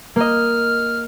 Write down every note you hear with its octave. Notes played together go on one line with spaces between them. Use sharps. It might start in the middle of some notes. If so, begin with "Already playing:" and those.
A#3 D#5 F6